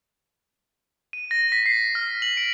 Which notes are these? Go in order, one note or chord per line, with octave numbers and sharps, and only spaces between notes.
D#7
A#6
B6
C7
F6
F#7
D7